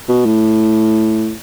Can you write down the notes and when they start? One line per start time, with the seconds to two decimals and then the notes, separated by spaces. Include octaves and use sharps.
0.09 B2
0.26 A2